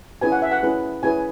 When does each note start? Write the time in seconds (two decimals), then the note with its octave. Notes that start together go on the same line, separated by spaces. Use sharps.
0.21 C#4 E4 G#4 B4 G#5
0.32 F#5
0.42 E5
0.51 F#5
0.63 C#4 E4 G#4 B4
1.03 C#4 E4 G#4 B4 G#5